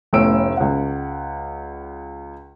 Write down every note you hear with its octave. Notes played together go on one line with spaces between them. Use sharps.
F1 A2 B3 C#4 E6 D7
C#2 F#5